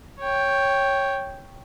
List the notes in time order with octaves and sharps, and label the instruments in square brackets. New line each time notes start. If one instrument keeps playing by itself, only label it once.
[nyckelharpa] C#5 G5